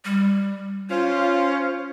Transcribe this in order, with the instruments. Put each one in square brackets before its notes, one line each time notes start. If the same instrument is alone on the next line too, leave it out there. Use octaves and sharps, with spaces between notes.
[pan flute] G3
[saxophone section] C#4 F4 [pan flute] C5